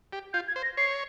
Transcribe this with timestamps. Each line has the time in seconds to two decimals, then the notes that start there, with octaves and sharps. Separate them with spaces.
0.13 G4
0.33 F4 G6
0.48 G#6
0.56 C5
0.62 A#6
0.77 C#5 C7